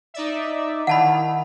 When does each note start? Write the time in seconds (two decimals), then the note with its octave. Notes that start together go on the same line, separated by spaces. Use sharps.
0.14 D#4 D5 E5
0.87 D#3 E4 F#5 A5 B5